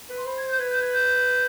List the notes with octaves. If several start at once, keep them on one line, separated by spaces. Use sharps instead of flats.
B4
C6
C5 B5
G#6
G6
B4 G#6
G6
G#6
G6